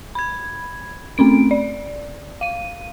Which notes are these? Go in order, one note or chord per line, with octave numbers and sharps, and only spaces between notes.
B5 G#6
A3 C4 C#4 D7
D5
F5 D#7